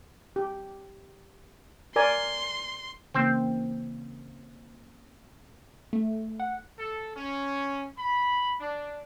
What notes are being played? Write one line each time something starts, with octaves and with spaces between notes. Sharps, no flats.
G4
A#4 D5 G#5 C6
C#3 E3 A#3 C4 C5
A3
F#5
A4
C#4
B5
D4